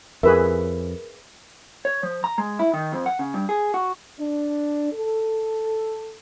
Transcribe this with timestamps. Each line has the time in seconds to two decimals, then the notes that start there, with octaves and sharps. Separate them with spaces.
0.23 F2 G#4 A#4 B4 E5
1.85 C#5
2.03 F3
2.24 A#5
2.38 G#3
2.59 E4
2.74 D#3
2.92 F2
3.06 F#5
3.19 C#3
3.34 G2
3.49 G#4
3.74 F#4
4.20 D4
4.93 A4